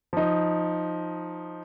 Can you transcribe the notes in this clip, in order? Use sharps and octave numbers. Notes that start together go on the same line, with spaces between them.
F3 D#4